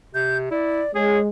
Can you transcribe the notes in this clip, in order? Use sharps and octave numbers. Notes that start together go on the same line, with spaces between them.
C3 G6
E4 D5
G#3 G#4 C#5